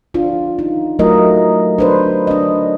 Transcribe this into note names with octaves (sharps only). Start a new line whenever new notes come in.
D4 F4
D#4
F#3 A3 F4 A#4 D#5
D4 B4 C5
D4 D#5